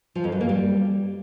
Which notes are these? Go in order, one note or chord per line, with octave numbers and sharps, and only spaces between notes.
F3
F2
F#2
A#3
G3